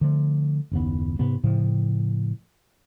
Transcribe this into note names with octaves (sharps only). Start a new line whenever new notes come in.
D3 F3 A3
F#1 D#2 B3
G#2 C3 B3
A2 C#3 F3